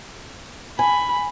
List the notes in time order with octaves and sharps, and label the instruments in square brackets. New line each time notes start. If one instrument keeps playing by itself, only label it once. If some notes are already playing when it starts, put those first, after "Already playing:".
[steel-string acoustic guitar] G#5 [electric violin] B5